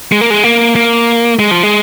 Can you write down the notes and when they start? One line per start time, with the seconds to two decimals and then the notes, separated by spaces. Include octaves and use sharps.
0.12 G#3
0.21 A#3
0.30 G#3
0.44 A#3
0.76 A#3
1.39 G#3
1.51 F3
1.63 G#3